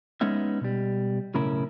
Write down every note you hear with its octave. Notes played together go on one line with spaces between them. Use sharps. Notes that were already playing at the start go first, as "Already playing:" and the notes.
G#3 B3 C#4 D#4 E5
B2 G3
B1 A2 C#3 C#4 E4 A#4